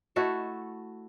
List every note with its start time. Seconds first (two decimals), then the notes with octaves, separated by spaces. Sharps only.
0.16 A3 E4 F#4 A4